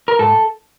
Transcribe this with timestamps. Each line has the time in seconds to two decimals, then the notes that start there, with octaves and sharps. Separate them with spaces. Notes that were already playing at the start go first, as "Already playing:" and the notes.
0.08 A#4
0.19 G#2 A4